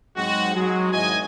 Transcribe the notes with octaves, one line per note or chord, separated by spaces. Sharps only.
G#2 F#3 G#3 C4 F#4
F#3 G#3
G#1 E2 D#5 G#5